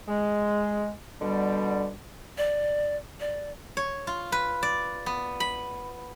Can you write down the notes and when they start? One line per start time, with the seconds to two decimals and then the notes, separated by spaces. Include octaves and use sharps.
0.07 G#3
1.22 B2 D3 G3
2.38 D5
3.20 D5
3.77 C#5
4.07 F4
4.32 B4
4.63 D5
5.06 B3
5.40 B5